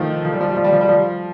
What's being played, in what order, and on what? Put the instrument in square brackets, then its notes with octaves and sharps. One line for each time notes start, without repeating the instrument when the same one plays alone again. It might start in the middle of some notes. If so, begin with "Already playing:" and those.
Already playing: [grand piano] D#3 F3 A3
F3
G3
F3
G3
F3
G3
F3
G3
F3